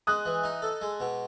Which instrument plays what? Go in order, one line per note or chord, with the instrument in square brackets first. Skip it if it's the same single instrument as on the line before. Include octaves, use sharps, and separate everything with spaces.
[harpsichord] G#3 [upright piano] D#6 F#6
[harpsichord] E3
D#4
A4
G#3
B2